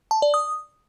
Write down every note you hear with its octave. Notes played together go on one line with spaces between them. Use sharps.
A5
D5
D#6